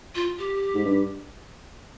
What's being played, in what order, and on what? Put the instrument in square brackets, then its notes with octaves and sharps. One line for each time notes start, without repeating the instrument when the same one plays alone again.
[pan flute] F4
G4
[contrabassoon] G#2
G2